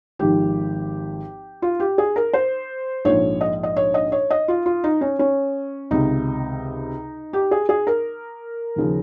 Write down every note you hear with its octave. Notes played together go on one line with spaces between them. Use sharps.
G#1 G#2 F3 G4
F4
G4
G#4
A#4
C5
A#1 G#2 F3 C#5
D#5
D#5
C#5
D#5
C#5
D#5
F4
F4
D#4
C#4
C#4
C#2 C3 D#3 D#4
G4
G#4
G#4
A#4
D#2 C#3 F3